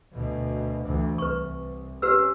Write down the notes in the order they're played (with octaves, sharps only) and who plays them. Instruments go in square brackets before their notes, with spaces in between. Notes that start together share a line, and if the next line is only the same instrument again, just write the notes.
[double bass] D2 B2
D2 E3
[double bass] C2 [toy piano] B4 C#6
[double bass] C#4 [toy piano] G4 B4 E6